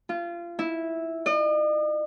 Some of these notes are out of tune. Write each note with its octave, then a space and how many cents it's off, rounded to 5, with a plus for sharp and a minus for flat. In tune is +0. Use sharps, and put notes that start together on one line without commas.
F4 -25
E4 -10
D#5 -45